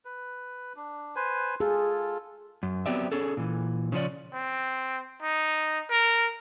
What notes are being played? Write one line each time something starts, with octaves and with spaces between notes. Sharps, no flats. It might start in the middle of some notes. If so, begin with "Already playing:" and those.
B4
D4
B4 C5 G#5
F4 G#4 A4
F#2
F#3 B3 C4 G4 D5 E5
C#4 G#4 A4
A#2 E3
C#3 F3 C#4 D5
C4
D#4
A#4